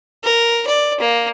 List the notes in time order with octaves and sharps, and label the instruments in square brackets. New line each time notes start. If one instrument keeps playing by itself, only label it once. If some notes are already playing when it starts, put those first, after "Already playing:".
[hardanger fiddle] A#4
D5
A#3